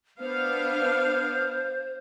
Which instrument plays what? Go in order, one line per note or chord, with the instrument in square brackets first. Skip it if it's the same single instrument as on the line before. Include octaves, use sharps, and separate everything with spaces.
[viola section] B3 D4 F5 [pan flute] C5